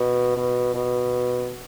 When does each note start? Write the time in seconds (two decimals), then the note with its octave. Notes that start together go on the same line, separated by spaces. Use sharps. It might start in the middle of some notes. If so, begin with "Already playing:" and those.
Already playing: B2
0.37 B2
0.75 B2